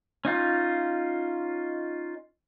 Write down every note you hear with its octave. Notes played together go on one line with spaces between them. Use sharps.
C#4 D#4 F4